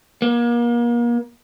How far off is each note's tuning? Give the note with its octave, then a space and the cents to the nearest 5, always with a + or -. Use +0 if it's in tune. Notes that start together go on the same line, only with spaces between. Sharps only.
A#3 +35